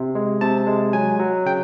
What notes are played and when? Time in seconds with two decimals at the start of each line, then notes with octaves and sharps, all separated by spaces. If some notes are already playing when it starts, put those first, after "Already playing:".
Already playing: C3
0.15 G#3
0.41 C3 A5
0.67 G#3
0.93 F#3 G#5
1.19 F#3
1.46 C#3 G5